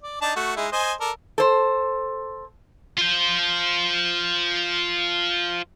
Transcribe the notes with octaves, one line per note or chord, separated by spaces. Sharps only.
D5
D4 D#4 A5
A3 F#4
G#3 D#4 E4
C5 D#5 G#5
A4 A#4 D5
A4 C5
F4 C5